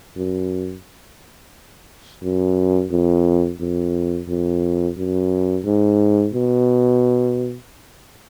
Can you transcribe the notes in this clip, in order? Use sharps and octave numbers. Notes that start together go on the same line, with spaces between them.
F#2
F#2
F2
F2
F2
F#2
G#2
B2